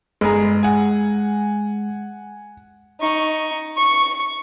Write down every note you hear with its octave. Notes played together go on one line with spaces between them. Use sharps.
G1 G#3 G#4 A#5
F#5 G#5
D#4 C#6
C#6